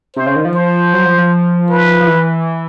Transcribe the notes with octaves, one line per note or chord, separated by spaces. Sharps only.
C3 C5
C#3
D#3
F3
C5
F#3
F3
F3
B4
F3
E3